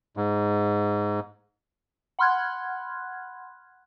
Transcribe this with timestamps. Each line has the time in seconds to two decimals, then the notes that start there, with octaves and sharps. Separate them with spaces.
0.17 G#2
2.19 F#5 B5 C6 F6 F#6 G#6